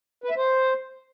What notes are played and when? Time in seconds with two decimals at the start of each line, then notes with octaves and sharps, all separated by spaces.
0.24 B4
0.30 E5
0.37 C5